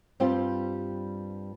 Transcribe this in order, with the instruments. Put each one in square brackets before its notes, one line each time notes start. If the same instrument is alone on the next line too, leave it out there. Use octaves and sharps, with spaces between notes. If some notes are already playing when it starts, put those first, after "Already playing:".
[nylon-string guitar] G2 G3 C4 F4 G4